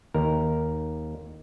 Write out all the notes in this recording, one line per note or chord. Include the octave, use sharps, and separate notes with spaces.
D#2 A#4